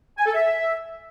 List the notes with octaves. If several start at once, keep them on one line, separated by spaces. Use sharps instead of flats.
G#5
A4
E5